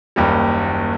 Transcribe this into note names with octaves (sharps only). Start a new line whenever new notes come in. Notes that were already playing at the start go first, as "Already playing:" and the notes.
F#1 D#2 G3